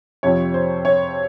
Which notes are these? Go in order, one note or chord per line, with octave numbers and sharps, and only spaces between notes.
F2 C3 F3 C#5
C5
C#5